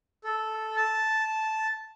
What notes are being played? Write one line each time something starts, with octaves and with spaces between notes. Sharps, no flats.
A4
A5